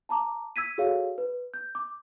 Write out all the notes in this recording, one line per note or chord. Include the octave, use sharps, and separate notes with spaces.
A5 A#5 D6
E6 G#6 B6 D#7
F#4 G#4 A4 C#5 F5
B4
G6
D6